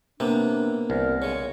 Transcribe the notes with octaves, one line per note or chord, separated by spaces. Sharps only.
C3 A#3 B3 D4
C2 A#4
C#3 G#3 C#5